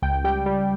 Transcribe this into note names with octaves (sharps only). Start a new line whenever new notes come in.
C#2 G5
G3 G5
G3